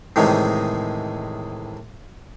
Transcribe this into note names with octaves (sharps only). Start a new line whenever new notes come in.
A2 C3 D#3 E3 G#3